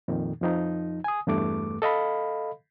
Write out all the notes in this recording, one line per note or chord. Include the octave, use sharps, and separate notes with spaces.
F2 A#2 D#3
F2 F3 D#4
G#5 D#6
E2 G2 A3 D6
A4 D#5 F5 B5